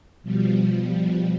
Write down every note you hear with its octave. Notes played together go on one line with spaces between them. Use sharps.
B2 F3 G3